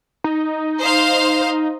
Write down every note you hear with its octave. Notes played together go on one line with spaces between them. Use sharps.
D#4
C5 F5